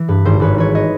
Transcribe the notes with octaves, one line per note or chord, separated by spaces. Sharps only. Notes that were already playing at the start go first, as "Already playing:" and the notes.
Already playing: E3
G2 B4
G#1 C5
G#1 B4 C#5
E3 B4 C#5
C#5 D#5